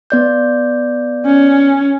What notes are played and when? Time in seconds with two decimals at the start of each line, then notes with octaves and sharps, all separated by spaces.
0.10 B3 D5 G6
1.26 C#4